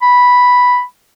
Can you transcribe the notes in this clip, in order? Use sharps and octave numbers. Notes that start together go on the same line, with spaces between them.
B5